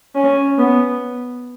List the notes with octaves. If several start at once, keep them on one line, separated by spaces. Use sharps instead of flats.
C#4
B3